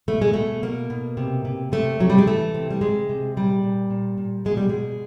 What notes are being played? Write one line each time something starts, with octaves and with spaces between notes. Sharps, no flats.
B2 A3
G#3
B2 A3
B2 A#3
B2
C3
C3
C3 A3
C3 F#3
G3
G#3
E3 A3
C3
G3
C3 G#3
C3
A#2 G3
A#2
A#2
A#2
B2 G#3
G3
B2 G#3